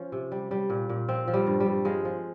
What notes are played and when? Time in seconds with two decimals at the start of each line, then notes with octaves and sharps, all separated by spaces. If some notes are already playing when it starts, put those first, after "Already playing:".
Already playing: F3 C#4
0.12 C3
0.32 G3
0.51 G3
0.70 A#2
0.89 A#2
1.09 F3 C4
1.28 F3
1.34 G3
1.47 G2
1.60 G3
1.66 G2
1.85 F3 G#3
2.05 F3